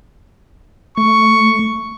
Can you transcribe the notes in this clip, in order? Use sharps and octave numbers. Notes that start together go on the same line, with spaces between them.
A3 C#6